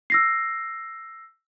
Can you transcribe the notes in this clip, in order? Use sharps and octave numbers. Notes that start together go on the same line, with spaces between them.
E6 A#6 C7